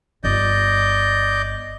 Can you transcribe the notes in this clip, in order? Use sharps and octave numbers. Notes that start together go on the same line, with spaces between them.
G1 F4 D5 D#5 G6